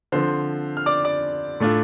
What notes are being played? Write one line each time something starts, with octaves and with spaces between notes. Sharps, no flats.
D3 F3 C4 C5 C6
F6
D5 D6
D5 D6
A2 A3 D4 F4